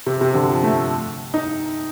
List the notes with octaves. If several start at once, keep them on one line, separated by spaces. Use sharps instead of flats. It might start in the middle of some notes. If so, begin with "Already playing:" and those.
C3
C3
D3
F3
A3
D#4